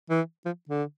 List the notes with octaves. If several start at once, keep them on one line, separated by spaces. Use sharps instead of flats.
E3
F3
D3